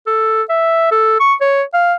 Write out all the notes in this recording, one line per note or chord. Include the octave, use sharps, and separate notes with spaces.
A4
E5
A4
C#6
C#5
F5